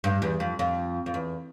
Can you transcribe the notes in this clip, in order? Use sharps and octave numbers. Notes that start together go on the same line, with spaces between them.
G2
E2
F2
F2
F2
E2